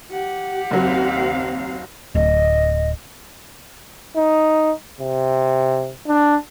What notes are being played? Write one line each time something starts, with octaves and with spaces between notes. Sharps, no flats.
G4 F#5
F#1 D#2 F#3 C4 F5
D1 D#5
D#4
C3
D4